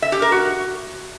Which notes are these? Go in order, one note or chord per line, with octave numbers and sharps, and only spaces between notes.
E5
G4
A#4
F#4